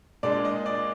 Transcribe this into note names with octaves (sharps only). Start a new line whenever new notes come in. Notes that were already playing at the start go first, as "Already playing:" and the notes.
A#2 G#3 D4 D5
D#5
D5